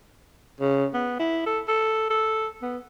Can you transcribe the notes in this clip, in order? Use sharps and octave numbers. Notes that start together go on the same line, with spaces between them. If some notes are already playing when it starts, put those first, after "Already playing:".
C#3
B3
E4
A4
A4
A4
B3